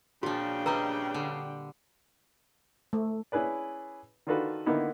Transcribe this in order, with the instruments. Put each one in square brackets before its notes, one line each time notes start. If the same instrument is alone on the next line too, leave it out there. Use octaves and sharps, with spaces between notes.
[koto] A#2 F3 [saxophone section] C#3 [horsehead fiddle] D4 G5 [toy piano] F#4
[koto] G3 D#5 [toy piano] B4 A#5
[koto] D3
[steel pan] A3
[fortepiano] C#4 E4 G#4 B4 D5
D#3 D4 F4 F#4 A4 B4
D3 D#3 A#3 B3 D#4 E4